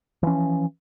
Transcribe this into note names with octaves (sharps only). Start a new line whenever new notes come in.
E3 F3 C#4